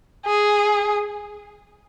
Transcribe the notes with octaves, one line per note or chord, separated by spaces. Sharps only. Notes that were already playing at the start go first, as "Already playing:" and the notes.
G#4